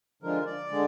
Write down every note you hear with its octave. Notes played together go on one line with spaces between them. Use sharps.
D3 F3 G#3 D4 F4 A#4
D5
D3 G#3